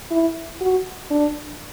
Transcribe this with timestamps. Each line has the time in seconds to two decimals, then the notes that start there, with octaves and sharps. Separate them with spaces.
0.11 E4
0.61 F#4
1.11 D4